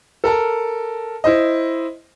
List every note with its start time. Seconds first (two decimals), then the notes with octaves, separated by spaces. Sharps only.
0.24 A4 A#4 A5
1.24 E4 C5 D#5